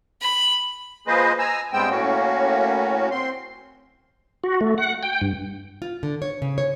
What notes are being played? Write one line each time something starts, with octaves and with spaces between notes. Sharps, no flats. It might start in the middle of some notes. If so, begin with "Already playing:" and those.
B5
F3 A#3 G#4 B4 C5 D#5
G#5 A#5 E6
G2 G#3 B3 C4 G5 E6
A2 A#3 C#4 F#4
C4 C6
F#4
A3
F#5
G5
G2
F4
D3
C#5
C#3
C#5